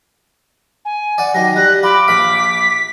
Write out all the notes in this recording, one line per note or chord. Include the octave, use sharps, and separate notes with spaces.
G#5
D5 F#5
D#3 F#3 A#6
G3 F#6
F4 B5 D6
A#1 F5 B6